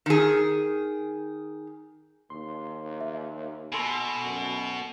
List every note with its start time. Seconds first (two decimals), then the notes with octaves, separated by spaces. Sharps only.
0.06 D#3 G#4
2.30 D#2 C6
3.01 E5
3.72 B2 A4 G#5 B5 C6
4.23 F#2